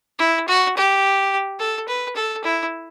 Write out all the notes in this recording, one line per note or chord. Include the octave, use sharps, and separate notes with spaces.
E4
F#4
G4
A4
B4
A4
E4